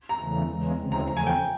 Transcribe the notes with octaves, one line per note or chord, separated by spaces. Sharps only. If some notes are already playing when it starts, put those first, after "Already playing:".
A#5
E2 C#3 E3 A3
E2 C#3 E3 G#3
D2 C#3 E3 G#3 C4
A#5
E2 C#3 F3 A3 A#5
G#5
G5